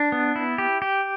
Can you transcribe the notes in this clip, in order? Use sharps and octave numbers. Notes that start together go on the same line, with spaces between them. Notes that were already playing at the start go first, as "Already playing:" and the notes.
Already playing: D4
B3
E4
G4
G4